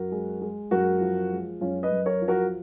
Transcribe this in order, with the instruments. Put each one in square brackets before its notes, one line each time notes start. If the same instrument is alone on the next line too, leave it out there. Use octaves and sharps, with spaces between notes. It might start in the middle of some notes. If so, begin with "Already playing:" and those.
Already playing: [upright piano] F#2 F#4 A#4
G#3
G#3
F#2 F#4 A#4
F3
G#3
F#2 C#4 F4
B4 D#5
F#2
A#4 C#5
F3
F#4 A#4